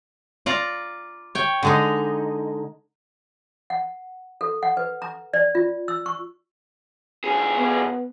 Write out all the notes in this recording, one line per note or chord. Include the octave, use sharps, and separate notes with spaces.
F4 D5 A#5
C#5 G5
D3 G#3 D#4
F#5
A4
F#5
B4
A#5
D5
F4
E6
C#6
B1 G#4
B3